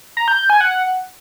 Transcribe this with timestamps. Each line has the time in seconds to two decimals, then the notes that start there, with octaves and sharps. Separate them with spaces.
0.17 A#5
0.28 G6
0.39 G6
0.50 G#5
0.61 F#5